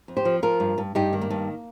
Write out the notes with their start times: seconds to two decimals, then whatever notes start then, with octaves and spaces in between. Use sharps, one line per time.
0.08 F2
0.17 G4 C5
0.25 F3
0.43 F3 F4 A#4
0.60 G2
0.78 G2
0.95 G2 D#4 G4
1.13 D#3
1.21 A#3
1.30 G2